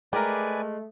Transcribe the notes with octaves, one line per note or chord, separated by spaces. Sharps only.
G#3 A3 G4 A#4 B4 D5 G#5